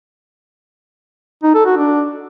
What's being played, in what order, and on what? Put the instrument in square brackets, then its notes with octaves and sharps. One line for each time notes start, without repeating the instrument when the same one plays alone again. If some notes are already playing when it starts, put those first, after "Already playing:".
[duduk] D#4
A4
F#4
D4